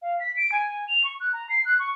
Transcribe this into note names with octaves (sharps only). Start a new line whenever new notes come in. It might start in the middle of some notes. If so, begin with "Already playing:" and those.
F5
B6
D7
G#5
F7
C#6
F#6
A#5
C7
F#6
C#6